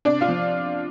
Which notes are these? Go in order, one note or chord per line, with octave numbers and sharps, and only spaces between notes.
C3 D4 D5
F4 F5
F3